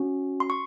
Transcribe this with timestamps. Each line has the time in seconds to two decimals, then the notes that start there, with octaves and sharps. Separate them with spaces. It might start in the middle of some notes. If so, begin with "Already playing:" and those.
Already playing: C#4 F#4
0.40 C6
0.50 C#6